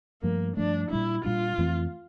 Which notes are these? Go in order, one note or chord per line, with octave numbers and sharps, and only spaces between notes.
G2 F3 A3 A#3
G2 F3 A3 D4
A#2 G3 D4 E4
A#2 G3 D4 F4
F2 E3 A3 C4